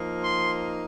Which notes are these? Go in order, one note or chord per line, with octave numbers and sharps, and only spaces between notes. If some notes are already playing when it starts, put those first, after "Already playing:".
Already playing: F3 A#3 D#4
C6